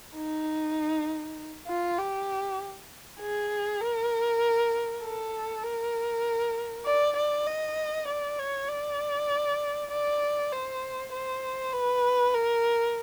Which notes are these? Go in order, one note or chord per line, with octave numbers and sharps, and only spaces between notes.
D#4
F4
G4
G#4
A#4
A4
A#4
D5
D5
D#5
D5
C#5
D5
D5
C5
C5
B4
A#4